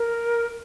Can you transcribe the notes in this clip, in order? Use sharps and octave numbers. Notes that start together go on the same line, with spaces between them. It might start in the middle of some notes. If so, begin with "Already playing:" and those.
Already playing: A#4